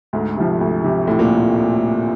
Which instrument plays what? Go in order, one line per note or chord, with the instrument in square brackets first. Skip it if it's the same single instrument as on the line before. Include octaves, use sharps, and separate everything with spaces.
[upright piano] D2 [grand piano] G#2
[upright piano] C3 F3
D2
C3 F3
[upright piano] D2 [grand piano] A2
[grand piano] A#2